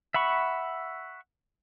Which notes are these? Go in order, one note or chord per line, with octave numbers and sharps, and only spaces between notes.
E5 F#5 B5 C#6